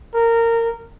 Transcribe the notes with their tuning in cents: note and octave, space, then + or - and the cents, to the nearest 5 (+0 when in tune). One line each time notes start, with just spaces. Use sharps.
A#4 -20